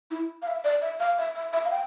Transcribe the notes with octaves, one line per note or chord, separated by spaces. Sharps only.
E4
F5
E5
D5
E5
F5
E5
E5
E5
F5
G5